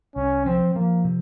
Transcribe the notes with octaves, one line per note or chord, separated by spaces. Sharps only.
C2 C#4
F3 C4
F3 A#3
C3